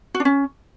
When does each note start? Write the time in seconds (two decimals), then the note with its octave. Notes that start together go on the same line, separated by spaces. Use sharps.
0.15 F#4
0.20 D4
0.25 C#4